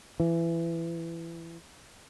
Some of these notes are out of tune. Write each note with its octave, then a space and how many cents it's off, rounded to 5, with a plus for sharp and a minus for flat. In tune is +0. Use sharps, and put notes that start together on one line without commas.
E3 +20